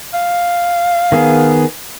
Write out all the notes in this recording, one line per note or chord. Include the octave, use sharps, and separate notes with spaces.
F5
D#3 B3 G#4